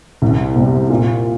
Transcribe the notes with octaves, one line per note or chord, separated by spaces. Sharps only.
C2
C3 G3
A#2